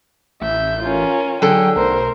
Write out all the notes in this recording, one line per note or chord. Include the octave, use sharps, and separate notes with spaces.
A1 E5 G6
C#4 F4 A#4
D3 F#3 G#4 A4 G5
B1 A3 A#4 C5